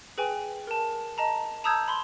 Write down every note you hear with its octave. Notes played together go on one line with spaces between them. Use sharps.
G#4 B4 G5 G#5
A#4 A5
D#5 A5 A#5
A5 A#5 D#6 E6 G6 G#6
B5 C6